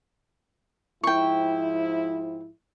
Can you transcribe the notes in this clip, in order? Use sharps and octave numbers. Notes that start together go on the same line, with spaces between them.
G#2 F3 E4 G5 C#6